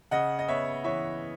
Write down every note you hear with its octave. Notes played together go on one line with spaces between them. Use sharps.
C#3 D#5 F#5
D#5
B3 C#5 E5
E3 C#5 E5